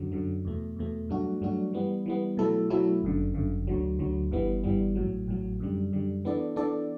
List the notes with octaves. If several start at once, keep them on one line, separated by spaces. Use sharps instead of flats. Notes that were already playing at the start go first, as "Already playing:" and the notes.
Already playing: F#2 D3 F#3
F#2 D3 F#3
E2 B2 A3
E2 B2 A3
G2 F#3 A3 D4 F#4
G2 F#3 A3 D4 F#4
E3 G3 B3
E3 G3 B3
B2 F#3 A3 E4 A4
B2 F#3 A3 E4 A4
G1 F#2 D3
G1 F#2 D3
D2 D3 F#3
D2 D3 F#3
G1 G2 E3 G3 B3
G1 G2 E3 G3 B3
A1 A2 F#3
A1 A2 F#3
F#2 D3 G3
F#2 D3 G3
E3 B3 D4 A4 D5
E3 B3 D4 A4 D5